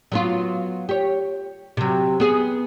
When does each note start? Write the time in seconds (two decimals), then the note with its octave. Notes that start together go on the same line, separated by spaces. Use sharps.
0.12 F#3 B3 F4
0.89 G4 C#5
1.77 C3 F#3
2.20 B3 G#4